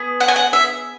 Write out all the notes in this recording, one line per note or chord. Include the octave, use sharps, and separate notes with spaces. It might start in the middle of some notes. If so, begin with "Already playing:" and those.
Already playing: B3 G#4
F#5
G#5
F#5
E5